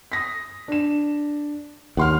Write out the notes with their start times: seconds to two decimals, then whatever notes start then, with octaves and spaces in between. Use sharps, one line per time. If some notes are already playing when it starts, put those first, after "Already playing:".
0.12 D#6 A#6 B6
0.68 D4 E7
1.97 D#2 F#5 C6 F6